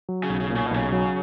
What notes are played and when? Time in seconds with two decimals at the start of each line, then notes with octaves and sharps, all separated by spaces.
0.09 F#3
0.23 C#3
0.30 B1
0.40 C#3
0.50 A#2
0.55 C#3
0.66 B2
0.71 B1 C#3
0.92 F#3